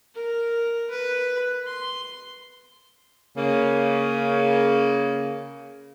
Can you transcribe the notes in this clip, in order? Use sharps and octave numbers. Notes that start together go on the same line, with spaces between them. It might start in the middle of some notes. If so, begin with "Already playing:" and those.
A#4
B4
C6
C#3 A#3